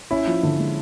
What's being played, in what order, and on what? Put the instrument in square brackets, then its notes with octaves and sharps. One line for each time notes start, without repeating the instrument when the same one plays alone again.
[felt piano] C#4 [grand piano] E4
[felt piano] F3
D3
G#3